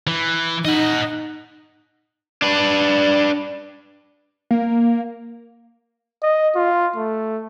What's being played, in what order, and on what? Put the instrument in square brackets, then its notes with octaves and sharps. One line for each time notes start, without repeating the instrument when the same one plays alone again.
[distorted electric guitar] E3
[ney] D#4 [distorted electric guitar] D#5 F#5
[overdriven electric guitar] D4 B4
[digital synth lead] A#3
[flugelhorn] D#5
F4
A3